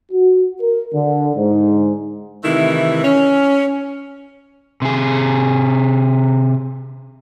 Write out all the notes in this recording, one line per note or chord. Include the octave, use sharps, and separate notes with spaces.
F#4
A#4
D3
G#2
C3 D#3 E3 A3 E4
C#4
C3 G#4